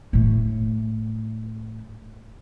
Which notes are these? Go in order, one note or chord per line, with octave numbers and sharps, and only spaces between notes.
A2 A3